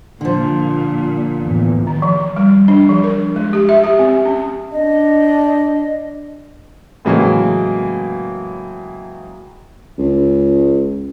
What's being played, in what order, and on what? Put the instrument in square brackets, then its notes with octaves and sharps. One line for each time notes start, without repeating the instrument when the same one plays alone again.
[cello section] A#2 [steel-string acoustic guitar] D3 F3
[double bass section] E2 A2
[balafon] D#3
F3
G3
D4
F3
A#4
G#3
G4
E5
G4
C4
C#4
[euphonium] D4 [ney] D#5
[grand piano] A2 C#3 E3 F#3 G#3 A#3
[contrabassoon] C#2